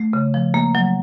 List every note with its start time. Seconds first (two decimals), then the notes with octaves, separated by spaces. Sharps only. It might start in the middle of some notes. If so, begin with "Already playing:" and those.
Already playing: A3
0.13 C#3
0.34 F3
0.54 A#3
0.75 F#3